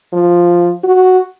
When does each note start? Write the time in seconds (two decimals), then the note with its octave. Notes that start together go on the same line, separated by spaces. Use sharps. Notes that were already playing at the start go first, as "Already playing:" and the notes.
0.13 F3
0.84 F#4